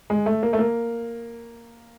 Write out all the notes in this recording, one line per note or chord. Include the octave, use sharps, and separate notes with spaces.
G#3
A3
A#3
A3
A#3